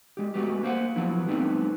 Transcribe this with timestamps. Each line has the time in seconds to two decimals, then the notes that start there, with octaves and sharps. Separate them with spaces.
0.17 G#3 G4
0.34 G#3 A3 B3 F#4 G4
0.63 A#3 C5 F5 F#5
0.96 F3 F#3 B3 E4
1.27 G3 A3 B3 C4 D4 D#4